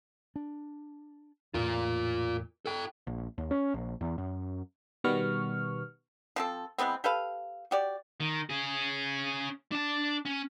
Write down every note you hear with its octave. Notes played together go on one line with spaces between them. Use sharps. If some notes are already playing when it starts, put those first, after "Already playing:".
D4
E2 A2 F4 A#4
A4 G5
A#1
D#2
C#4
A#1
E2
F#2
B2 D#3 G3 B3 C#6 F6
F3 C4 A4
E3 G#3 B3 C4
G4 A4 B4 F5
F#4 G4 D5
D#3
C#4 G#4
D4 A5
C#4